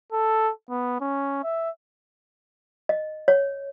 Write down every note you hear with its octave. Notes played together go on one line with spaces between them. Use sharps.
A4
B3
C#4
E5
D#5
C#5